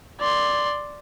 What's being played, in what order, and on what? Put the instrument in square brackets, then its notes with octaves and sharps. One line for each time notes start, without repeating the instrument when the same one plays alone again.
[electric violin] D5 C6